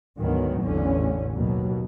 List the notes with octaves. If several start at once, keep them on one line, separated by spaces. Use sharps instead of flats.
D2 G#2 D#3 F#3 B3
A1 E2 D3 C#4
D#2 B2 F#3